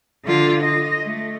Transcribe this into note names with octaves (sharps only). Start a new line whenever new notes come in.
D3 F4
D#5
A3